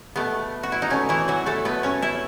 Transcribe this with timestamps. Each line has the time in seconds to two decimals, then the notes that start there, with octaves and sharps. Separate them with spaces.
0.16 B2 A3 B3
0.63 F#4
0.72 E4
0.82 D#4
0.90 B2 A3 C#4
1.09 E3 E4
1.28 F#3 F#4
1.46 A3 A4
1.65 B2 A3 B3 B4
1.83 C#4 C#5
2.02 E4 E5